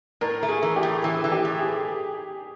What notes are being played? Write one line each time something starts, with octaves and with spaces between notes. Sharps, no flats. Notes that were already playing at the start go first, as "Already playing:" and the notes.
A2 A#4
A3
G#4
E3
G4
A2
E3 G#4
E3
G4
A2
G#4